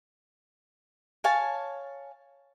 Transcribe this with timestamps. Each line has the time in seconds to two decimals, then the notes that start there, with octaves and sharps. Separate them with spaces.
1.24 C#5 F5 G#5 A5